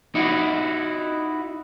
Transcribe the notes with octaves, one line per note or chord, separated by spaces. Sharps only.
D#4 E4 F#4